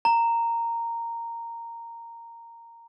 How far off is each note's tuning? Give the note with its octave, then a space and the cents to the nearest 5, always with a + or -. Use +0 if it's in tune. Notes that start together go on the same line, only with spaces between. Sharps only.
A#5 -10